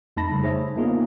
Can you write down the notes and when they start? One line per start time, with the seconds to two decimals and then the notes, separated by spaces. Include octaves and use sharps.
0.17 F2 A3 D#4 A5 B5 A#6
0.31 C#3 G3 A3 D#4
0.43 G#4 C5 C#5 E5
0.76 A#3 B3 D#4 F4 G#4 A#4